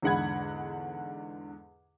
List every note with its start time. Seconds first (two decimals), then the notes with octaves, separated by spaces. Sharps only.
0.02 E2 G#2 D3 F#5 B5 G#6